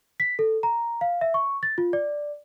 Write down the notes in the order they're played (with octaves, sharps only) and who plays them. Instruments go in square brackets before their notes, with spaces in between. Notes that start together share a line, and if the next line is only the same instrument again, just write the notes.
[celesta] B6
A4
A#5
F5
E5
C#6
A6
F4
D5